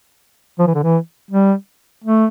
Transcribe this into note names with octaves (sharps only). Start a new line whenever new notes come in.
F3
E3
D3
E3
G3
A3